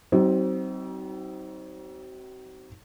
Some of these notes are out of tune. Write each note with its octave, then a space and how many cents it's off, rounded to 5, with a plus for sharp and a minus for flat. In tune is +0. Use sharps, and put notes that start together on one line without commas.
F#3 +45 C4 +0 D#4 +20